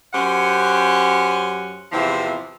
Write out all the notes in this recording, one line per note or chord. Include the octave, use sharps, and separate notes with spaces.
F#2 C#4 G4 C5 F#5
E2 C3 E3 F3 C4 E5